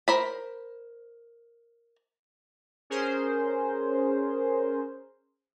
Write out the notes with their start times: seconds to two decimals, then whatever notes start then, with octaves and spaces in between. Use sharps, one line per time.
0.08 A#4 C5 B5
2.90 C#4 G#4 A#4 C5